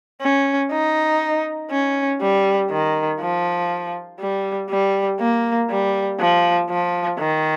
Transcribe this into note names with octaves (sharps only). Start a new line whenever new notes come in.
C#4
D#4
C#4
G3
D#3
F3
G3
G3
A#3
G3
F3
F3
D#3